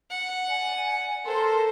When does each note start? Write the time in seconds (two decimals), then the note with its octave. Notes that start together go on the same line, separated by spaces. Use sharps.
0.10 F#5
0.47 D5 G#5
1.26 A4 A#4 C5 C6